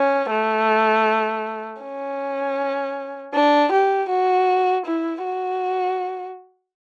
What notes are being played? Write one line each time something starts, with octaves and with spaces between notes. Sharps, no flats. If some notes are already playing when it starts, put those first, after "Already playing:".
Already playing: C#4
A3
C#4
D4
G4
F#4
E4
F#4